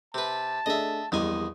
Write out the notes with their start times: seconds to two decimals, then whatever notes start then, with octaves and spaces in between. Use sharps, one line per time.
0.14 C3 B4 A5
0.66 A3 D4 G#4 D#5 E5
1.12 A#1 E2 G3 G#3 D#5 G#5 D#6